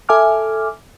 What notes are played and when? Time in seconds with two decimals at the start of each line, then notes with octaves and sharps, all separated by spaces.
0.09 A4 E5 G#5 D6 F6